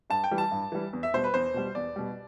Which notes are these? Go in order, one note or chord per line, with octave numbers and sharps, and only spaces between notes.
G2 A5
G5
E3 G3
A5
G2
E3 G3
E2
E5
B2 G3 C5
B4
E2 C5
B2 G3
E2 D5
B2 G3